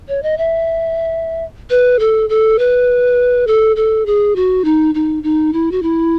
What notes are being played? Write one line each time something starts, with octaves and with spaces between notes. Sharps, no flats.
C#5
D#5
E5
B4
A4
A4
B4
A4
A4
G#4
F#4
D#4
D#4
D#4
E4
F#4
E4